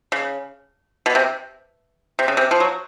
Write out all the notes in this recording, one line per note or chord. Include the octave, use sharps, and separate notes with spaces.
C#3
B2
C3
C3
C#3
C3
F3
F#3